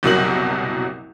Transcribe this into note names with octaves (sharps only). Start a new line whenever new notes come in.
F#1 C2 B2 F#3 A#4 F#7